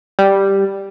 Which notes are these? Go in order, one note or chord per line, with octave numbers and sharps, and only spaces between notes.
G3